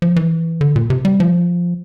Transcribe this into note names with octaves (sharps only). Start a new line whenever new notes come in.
F3
E3
D3
A#2
C3
G3
F3